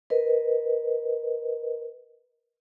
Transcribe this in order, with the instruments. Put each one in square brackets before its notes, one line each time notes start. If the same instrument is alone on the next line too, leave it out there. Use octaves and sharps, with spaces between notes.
[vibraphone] A#4 B4 D#5